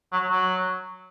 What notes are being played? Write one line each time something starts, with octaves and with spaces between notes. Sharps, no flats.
F#3
F#3